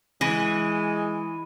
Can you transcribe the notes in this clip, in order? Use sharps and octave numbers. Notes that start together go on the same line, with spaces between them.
E3 G#3